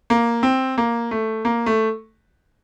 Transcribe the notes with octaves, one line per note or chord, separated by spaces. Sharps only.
A#3
C4
A#3
A3
A#3
A3